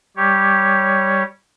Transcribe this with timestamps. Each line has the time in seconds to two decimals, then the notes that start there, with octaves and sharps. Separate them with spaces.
0.17 G3 G4 C#5